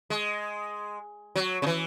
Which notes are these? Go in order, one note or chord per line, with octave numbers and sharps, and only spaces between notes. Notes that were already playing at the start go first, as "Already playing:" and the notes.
G#3
F#3
C#3
E3